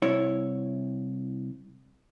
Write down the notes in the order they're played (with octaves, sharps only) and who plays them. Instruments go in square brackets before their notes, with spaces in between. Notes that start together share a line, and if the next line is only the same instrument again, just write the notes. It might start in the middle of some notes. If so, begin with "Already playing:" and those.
[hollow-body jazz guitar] C2 E4 C#5